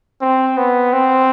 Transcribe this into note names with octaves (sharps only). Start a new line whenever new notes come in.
C4
B3
C4